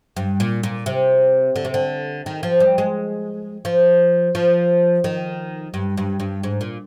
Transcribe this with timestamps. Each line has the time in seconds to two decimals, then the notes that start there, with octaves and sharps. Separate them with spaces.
0.16 G2
0.40 A#2
0.63 A#2
0.86 C3
1.56 D3
1.65 C3
1.74 D3
2.26 D#3
2.43 F3
2.60 G3
2.78 G#3
3.65 F3
4.35 F3
5.04 D#3
5.74 G2
5.97 G2
6.20 G2
6.43 G#2
6.61 A#2